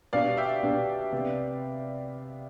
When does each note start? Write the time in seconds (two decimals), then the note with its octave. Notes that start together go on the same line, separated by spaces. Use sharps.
0.13 B2 B3 D4 G4 D5 F5
0.37 E5 G5
0.63 B2 B3 D4 G4
1.12 C3 B3